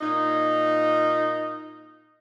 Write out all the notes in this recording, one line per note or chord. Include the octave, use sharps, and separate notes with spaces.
A#2 D#4